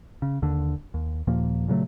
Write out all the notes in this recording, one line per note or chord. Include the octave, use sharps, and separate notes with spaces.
C#3
D#2 D3
D#2
D#2 A#2 F3 A#3
A#2 C#3 F#3 A3